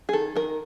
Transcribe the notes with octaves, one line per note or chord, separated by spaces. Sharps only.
G#4
D#3 A4
D#3 A#4